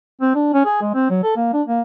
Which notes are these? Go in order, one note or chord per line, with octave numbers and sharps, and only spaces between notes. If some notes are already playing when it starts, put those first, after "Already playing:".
C4
D4
C#4
G#4
G#3
C4
F#3
A4
A#3
D4
A#3